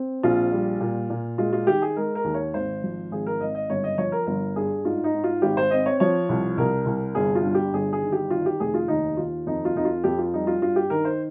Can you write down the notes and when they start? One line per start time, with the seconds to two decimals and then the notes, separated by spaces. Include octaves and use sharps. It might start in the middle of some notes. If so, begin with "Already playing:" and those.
Already playing: C4
0.23 A#1 F4
0.52 G3
0.80 A#2
1.10 A#2
1.38 G#3 F4
1.53 F4
1.67 D#3 G4
1.82 G#4
1.96 G#3 A#4
2.15 A#4
2.24 D#2
2.34 C#5
2.54 G#1 C5
2.83 F3
3.11 G#1 G#4
3.27 A#4
3.41 G#1 D#5
3.55 D#5
3.69 G1 C#5
3.84 D#5
3.98 F3 C#5
4.12 A#4
4.27 G1 A#4
4.56 G2 G#4
4.85 G#2 F4
5.04 D#4
5.14 G#2
5.24 F4
5.42 G#1 G4
5.57 C5
5.71 C4 D#5
5.86 C#5
6.00 F3 C#5
6.29 C2
6.58 C2 A#4
6.86 C2
7.15 G1 G#4
7.35 F4
7.44 G2
7.55 G4
7.73 G1 G#4
7.93 G#4
8.02 D#3
8.12 G4
8.30 D#3 F4
8.46 G4
8.60 F1 G#4
8.74 F4
8.88 D#2 D#4
9.17 D#2 F4
9.47 F2 D#4
9.65 F4
9.76 F2 D#4
9.85 F4
10.04 F2 G4
10.18 F4
10.33 G3 D#4
10.47 F4
10.62 G2 F4
10.76 G4
10.90 D#3 A#4
11.05 C5